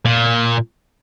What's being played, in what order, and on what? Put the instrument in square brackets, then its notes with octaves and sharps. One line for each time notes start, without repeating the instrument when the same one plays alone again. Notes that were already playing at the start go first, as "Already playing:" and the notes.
[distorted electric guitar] A#2